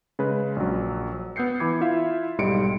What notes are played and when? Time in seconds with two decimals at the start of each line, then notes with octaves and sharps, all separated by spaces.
0.19 C#3 G#3 B4
0.56 A#1 F#3
1.36 B3 E6 G6 C7 C#7
1.60 E3 B5 D6 G#6
1.81 E4 F4 E5 F5
2.38 B1 G#2 G3 C6 C#7 D7